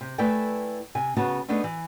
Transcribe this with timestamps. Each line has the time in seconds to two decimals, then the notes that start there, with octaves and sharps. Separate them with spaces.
0.01 C3
0.18 A3 E4 B4 D5 G5 G#5
0.95 C3 G#5
1.17 C#3 B3 F#4 C#5 F#5 A5
1.48 A3 B3 D4 D#4 G#4 A4
1.64 E3